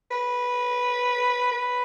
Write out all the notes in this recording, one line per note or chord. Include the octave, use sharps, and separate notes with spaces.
B4
B4